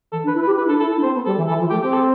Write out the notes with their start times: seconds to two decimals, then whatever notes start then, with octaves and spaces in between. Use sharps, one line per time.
0.12 E3 A4
0.23 D4
0.28 B4
0.34 E4
0.42 B4
0.46 G4
0.57 E4 B4
0.67 D4 A4
0.78 E4 A4
0.91 A4
0.96 D4
1.03 C4 C5
1.14 B3
1.25 G3 A4
1.37 E3
1.48 E3 A4
1.60 F3
1.70 A3 G4
1.82 C4 G4
1.93 A4